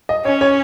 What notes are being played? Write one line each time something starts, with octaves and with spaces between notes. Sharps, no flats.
D#5
C#4 C#5
C#5